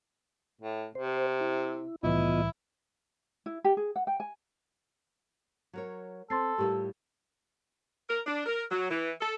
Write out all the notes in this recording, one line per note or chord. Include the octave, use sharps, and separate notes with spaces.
A2
C3 C5
E4
C2 A2 E3 B3 E4 F4 D#5
E4
G4
G#4
F#5
G5
G#5
F#3 A#4 C#5
C4 A4 C6 A6 C7
A2 G3 F4 G4 A#4
A#4
D4
A#4
F#3
E3
A4